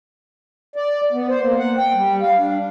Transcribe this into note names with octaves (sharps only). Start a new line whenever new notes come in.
D5
B3
C5
A#3
F#5
G5
G3
F5
D4